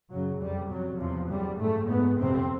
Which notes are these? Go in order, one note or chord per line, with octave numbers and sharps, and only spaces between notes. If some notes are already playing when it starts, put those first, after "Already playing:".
F#2 C#3 F#3
F2 C3 G3
F2 C3 F#3
E2 C3 F3
F#2 C#3 G3
G#2 A3
G#2 B3
F2 C3 C4